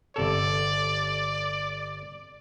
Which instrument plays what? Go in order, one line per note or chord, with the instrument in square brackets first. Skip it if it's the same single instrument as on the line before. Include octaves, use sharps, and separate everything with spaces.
[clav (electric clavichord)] G1 C3 A4 [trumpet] D5